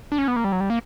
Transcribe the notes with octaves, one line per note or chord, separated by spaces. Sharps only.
D4
C#4
B3
A#3
G3
F#3
G3
A#3